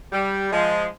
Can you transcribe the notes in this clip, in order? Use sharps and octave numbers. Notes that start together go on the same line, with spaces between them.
G3
F3 G#3